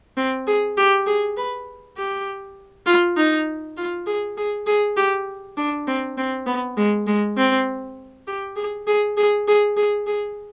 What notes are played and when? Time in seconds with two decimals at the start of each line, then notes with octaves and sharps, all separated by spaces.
0.17 C4
0.47 G#4
0.77 G4
1.07 G#4
1.37 B4
1.97 G4
2.86 F4
3.17 D#4
3.77 F4
4.07 G#4
4.37 G#4
4.67 G#4
4.97 G4
5.57 D4
5.87 C4
6.18 C4
6.47 B3
6.77 G#3
7.07 G#3
7.37 C4
8.27 G4
8.56 G#4
8.87 G#4
9.17 G#4
9.48 G#4
9.77 G#4
10.07 G#4